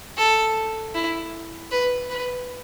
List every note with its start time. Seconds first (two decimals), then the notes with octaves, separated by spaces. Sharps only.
0.17 A4
0.94 E4
1.71 B4
2.09 B4